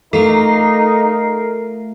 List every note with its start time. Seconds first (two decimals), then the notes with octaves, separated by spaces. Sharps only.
0.13 A3 D#4 F4 A4 A#4 C7